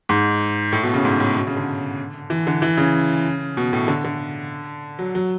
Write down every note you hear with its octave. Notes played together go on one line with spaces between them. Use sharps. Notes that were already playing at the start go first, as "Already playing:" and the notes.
G#2
A2
B2
C#3
G#2
A2
B2
C#3
D3
E3
D3
E3
C#3
B2
A2
D3
D3
F#3
F#3